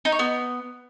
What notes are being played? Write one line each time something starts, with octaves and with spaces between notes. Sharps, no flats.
D#4
C#5
B3